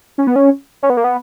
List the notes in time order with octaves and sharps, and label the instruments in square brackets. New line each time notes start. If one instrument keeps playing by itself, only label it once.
[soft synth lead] C#4
B3
C#4
C#4
B3
A#3
B3